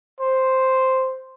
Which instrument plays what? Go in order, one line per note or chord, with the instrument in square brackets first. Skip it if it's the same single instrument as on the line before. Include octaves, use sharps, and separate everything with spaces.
[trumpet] C5